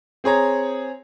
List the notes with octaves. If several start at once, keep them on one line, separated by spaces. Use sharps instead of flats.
C4 G#4 C#5 A#5